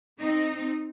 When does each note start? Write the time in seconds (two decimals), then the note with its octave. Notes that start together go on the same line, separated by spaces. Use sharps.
0.18 C4 D#4